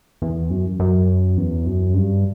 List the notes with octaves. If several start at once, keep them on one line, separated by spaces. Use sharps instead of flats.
E2
F#2
F#2
E2
F#2
G2